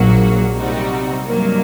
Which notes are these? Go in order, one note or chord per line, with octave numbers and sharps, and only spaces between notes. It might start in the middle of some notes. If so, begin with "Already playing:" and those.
Already playing: A#1 A#2 F#3 A#3 F#4
C3 G3 C4 D#4 F#4
G2 D#3 F#3 A#3